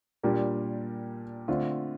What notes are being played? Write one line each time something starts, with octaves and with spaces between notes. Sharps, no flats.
A#2 G3 D4 G4 A#4
D3 A3 C4 F4